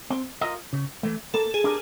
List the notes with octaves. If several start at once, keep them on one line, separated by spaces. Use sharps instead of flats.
C4
F4 A#4 D#5
C#3
E3 A3
A#3 A4
G#4
D4 G4 A#4